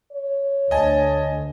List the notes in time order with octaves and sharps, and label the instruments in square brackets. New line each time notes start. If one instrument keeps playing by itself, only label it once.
[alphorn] C#5
[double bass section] D2 [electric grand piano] D#5 G#5 A5